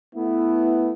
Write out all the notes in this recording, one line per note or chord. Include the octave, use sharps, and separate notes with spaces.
A3 B3 E4